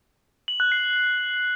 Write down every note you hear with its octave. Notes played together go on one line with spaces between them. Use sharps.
F#7
F#6
C7